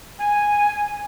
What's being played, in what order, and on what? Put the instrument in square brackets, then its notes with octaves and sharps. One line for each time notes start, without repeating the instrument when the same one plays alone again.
[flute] G#5